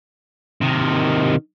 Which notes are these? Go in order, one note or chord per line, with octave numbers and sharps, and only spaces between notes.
C3 D#3